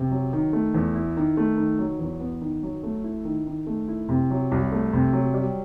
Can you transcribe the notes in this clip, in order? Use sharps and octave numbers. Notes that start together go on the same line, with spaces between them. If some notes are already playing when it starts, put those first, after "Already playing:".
Already playing: C3
F#3
D#3
A3
E2
E4
D#3
A3
D#3
F#3
E2
B3
D#3
F#3
A3
E4
D#3
D#3
A3
E4
C3
F#3
C2
A3
C3
F#3
G3